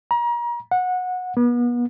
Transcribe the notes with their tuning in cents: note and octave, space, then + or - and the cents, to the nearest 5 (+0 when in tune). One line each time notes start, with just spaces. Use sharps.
A#5 +35
F#5 -20
B3 -35